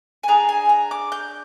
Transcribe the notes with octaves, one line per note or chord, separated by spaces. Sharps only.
G#5
D4 G#4 A#5
G#5
A#5
D6
G6